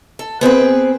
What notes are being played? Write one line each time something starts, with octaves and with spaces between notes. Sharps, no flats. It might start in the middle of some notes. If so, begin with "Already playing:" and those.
A4
B3 C4 G#4 B4